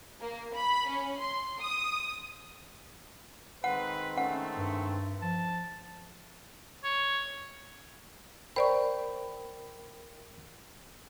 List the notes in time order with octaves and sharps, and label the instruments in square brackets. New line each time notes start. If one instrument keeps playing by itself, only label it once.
[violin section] A#3
B5
C#4
C6
D#6
[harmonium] D#3 G#3 C4 [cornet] B4 [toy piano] F#5
[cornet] A3 [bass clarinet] C#4 [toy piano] F#5
[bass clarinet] G2
[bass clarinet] F3 [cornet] A5
[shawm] C#5
[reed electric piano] A#4 G5 B5 [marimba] C5 D5 C#6